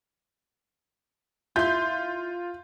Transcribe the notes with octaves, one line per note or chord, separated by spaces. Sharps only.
E4 F4 C6 G6